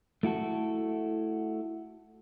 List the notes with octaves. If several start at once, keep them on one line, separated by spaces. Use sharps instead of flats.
A3 E4 F#4 A4